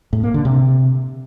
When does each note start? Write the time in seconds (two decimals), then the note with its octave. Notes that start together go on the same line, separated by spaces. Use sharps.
0.13 A2
0.23 A#3
0.34 D3
0.45 C3